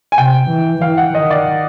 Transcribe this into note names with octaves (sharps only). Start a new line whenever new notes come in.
G#5
C3 G5
E3
E3 F5
F#5
D#3 D#5
D5